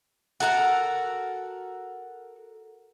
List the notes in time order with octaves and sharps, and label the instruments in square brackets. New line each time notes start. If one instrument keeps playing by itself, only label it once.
[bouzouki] F#4 A4 A#4 F#5